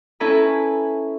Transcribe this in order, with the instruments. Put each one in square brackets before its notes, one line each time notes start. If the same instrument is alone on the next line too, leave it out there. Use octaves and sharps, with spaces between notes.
[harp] C#4 E4 A4 B4 G#5 A#5